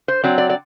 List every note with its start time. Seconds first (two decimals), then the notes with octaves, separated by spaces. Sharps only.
0.08 C5
0.23 F#3 C4 D5
0.38 D5
0.49 D5